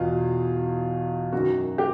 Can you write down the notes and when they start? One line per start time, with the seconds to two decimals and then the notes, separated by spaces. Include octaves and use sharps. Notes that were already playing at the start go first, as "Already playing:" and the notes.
Already playing: E2 B2 F4
1.33 F#2 D#3 F#4
1.78 G4